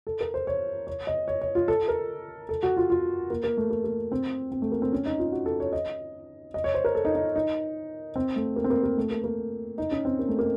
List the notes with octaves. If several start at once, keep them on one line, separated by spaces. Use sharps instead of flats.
A4
A#4
C5
C#5
C#5
D#5
C#5
C#5
F4
A4
A#4
A4
F#4
F4
F4
A#3
A#3
A3
A#3
A#3
C4
C4
A3
A#3
C4
C#4
D#4
F4
F#4
A4
C#5
D#5
D#5
C#5
C5
A#4
A4
D#4
D#4
D#4
C4
A3
A#3
C4
A#3
A#3
A3
A#3
A#3
D#4
C#4
C4
A#3
A3
A#3